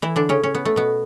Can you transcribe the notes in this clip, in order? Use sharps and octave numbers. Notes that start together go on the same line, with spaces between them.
E3 E4
D3 D4
C#3 C#4
C#4
B3
A3
B2 B3